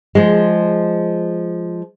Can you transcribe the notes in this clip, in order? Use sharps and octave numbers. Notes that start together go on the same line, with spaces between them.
F3 G#3